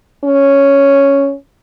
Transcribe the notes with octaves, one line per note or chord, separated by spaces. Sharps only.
C#4